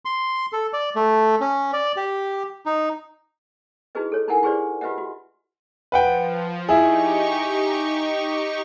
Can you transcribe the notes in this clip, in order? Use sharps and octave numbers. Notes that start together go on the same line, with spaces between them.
C6
A4
D5
A3
C#4
D5
G4
D#4
D#4 E4 F#4 G#4 B4 D#5
A4 C#5
D#4 E4 A4 A#4 F#5 G#5
E4 G4 G#4 B4 C5 D5
F4 G4 B4 D#5 E5 F#5
F#4
F3 B4 F#5 G5
D#4 E4 G4 G#4 C#6